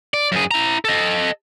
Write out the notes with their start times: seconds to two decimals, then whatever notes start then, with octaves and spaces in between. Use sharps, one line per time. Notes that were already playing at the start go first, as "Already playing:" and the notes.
0.14 D5
0.32 F#2 G#4
0.51 E4 A#5
0.85 A4 D#5